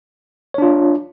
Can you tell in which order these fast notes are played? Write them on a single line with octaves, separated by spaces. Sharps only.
C#5 D4 F4